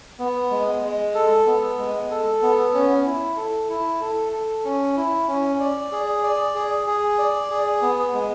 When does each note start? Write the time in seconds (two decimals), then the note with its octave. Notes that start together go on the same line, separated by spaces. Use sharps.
0.19 B3
0.51 G#3
0.83 G#3
1.15 A4
1.47 B3
1.79 G#3
2.11 A4
2.42 B3
2.74 C#4
3.06 E4
3.37 A4
3.70 E4
4.01 A4
4.33 A4
4.64 C#4
4.97 E4
5.28 C#4
5.60 D5
5.92 G#4
6.23 D5
6.55 G#4
6.87 G#4
7.19 D5
7.50 G#4
7.82 B3
8.13 G#3